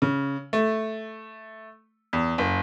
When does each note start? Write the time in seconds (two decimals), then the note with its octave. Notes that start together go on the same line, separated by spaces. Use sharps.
0.02 C#3
0.53 A3
2.13 E2
2.38 F#1